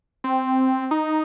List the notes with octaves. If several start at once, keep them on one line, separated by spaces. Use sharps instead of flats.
C4
D#4